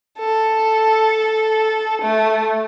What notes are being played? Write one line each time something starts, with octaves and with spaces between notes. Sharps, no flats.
A4
A3